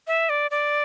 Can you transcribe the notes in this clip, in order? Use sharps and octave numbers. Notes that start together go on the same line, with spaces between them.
E5
D5
D5